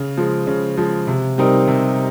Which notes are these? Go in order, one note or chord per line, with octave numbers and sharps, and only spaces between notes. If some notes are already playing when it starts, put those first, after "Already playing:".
Already playing: C#3
F3 G#3
C#3
F3 G#3
C3
G3 C4 D#4 A#4
C3